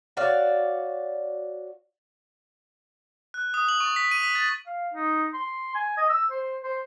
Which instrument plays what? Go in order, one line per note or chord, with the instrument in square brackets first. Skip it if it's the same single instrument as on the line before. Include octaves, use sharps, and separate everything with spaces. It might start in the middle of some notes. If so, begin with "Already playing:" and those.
[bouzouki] F#4 C#5 D5 F5
[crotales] F#6
D#6
F#7
C#6
B6
D#7
B6
A6
[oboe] F5
D#4
C6
G#5
D#5
E6
C5
C5